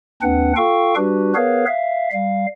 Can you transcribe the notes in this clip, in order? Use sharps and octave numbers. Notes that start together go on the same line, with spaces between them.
D#2 C4 D4 B4 F#5
F4 A4 F5 G5 C#6
G3 D4 F#4 G4 B4
B3 G#4 A#4 B4 C#5 F5
E5 F5
G3 F5